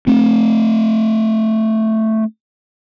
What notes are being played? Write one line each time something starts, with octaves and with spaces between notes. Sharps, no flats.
A3 C4